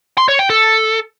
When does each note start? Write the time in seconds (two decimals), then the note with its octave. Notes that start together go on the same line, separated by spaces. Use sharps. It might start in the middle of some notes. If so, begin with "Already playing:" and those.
0.18 C6
0.28 C#5
0.39 G5
0.50 A4